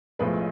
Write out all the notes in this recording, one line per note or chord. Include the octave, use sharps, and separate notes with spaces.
B1 A2 F3 G#3 B4